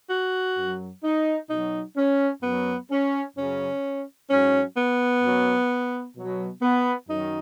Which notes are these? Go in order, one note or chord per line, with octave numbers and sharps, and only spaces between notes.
F#4
F#2 F#3
D#4
B2 F#3 D#4
C#4
F#2 F#3 B3
C#4
F#2 C#3 F#3 C#4
G#2 F#3 C#4
B3
F#2 F#3
B2 F#3
B3
F#2 D#3 F#3 D#4